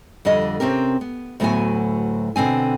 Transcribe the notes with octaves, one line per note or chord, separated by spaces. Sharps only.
F2 D3 G3 D#5
C3 C4 C#4 G4 A#4
B3
D2 A2 F#3 B3 F#4 G#5
B2 D3 C4 G#5